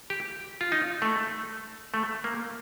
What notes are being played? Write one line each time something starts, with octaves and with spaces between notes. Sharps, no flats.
G4
F4
D#4
A3
A3
A#3